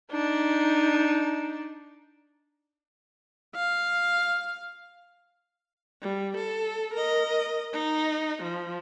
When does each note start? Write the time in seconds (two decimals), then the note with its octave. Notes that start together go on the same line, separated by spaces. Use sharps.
0.11 D4 D#4
3.56 F5
6.02 G3
6.37 A4
6.94 A#4 D#5
7.73 D#4
8.43 F3